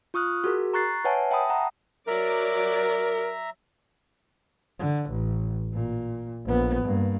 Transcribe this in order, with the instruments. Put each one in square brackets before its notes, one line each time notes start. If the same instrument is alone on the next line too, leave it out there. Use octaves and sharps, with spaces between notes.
[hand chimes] F4 C#6 D#6 F6 F#6
F#4 G#4 A#4
A#5 C#6 F#6 A6 C7
B4 C#5 E5 F#5 G#5 A5
E5 G5 A5 B5 D#6
F#5 A#5
[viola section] F#3 D5 [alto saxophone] A#4 [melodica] E5 A#5
[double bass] D3
A1
A#2
A#1 B3
G2 A#3